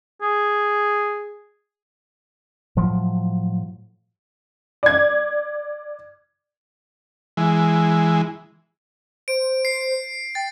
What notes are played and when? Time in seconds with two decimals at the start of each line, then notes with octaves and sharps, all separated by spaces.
0.22 G#4
2.77 A2 F3 F#3
4.83 D5 G#6
7.37 E3 G#3
9.28 C5 D7
9.65 C7
10.35 G5 A6